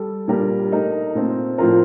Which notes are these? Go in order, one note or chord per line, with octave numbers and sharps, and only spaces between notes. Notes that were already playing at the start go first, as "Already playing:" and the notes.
Already playing: G3 A4
A#2 G3 D4 G4 A#4
A3 D#4 A#4
A#2 A3 C4
A2 F3 C4 F4 A#4